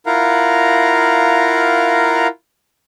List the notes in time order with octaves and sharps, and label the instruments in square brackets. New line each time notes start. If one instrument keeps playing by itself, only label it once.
[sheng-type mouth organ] E4 F4 A#4 F5 F#5 A#5